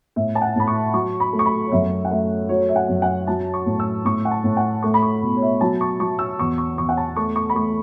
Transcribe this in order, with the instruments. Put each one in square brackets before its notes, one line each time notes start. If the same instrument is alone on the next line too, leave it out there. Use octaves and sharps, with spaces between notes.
[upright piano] A2 E5
A5
F#5
A2 B5
C#6
F#3 C#6
B5
A3
C#6
B5
C#5
F#2 E5
F#5
A3 E5
F#3 C#5
E5
F#5
F#2
F#5
F#3 A5
C#6
A2
E6
A2 C#6
F#5
A5
A2
F#5
A3 C#6
B5
C#6
B2
C#5
E5
F#3 A5
C#6
F#3 C#6
E6
E2 C#6
C#6
E2 C#6
F#5
A5
A3 C#6
C#6
B5
A3 C#6